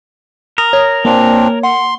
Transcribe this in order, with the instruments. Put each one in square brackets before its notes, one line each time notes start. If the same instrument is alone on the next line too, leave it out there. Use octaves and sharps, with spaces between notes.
[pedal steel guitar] A#4 [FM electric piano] D#6
[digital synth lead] C#5
[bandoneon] A#2 C4 D4 [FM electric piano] A#3
[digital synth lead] F#5 [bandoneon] C6